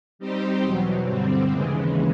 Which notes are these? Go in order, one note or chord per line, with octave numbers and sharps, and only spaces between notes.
G3 C4 D#4 G4 C5
E2 B2 F#3
G2 D3 G3 C4
D#2 C#3 E3 G#3